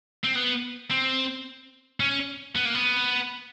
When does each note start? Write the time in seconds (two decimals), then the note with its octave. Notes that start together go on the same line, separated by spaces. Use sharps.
0.24 C4
0.35 B3
0.90 C4
2.00 C#4
2.56 B3
2.65 A#3
2.75 B3